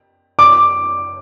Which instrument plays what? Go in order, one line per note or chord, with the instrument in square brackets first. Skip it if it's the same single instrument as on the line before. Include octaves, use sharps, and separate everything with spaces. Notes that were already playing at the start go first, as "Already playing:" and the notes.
[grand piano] D6